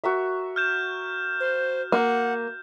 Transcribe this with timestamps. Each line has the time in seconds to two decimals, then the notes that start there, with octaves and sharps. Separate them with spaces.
0.04 F#4 A#4 E5
0.56 F6 G6 E7
1.40 C5
1.92 A#3 F#5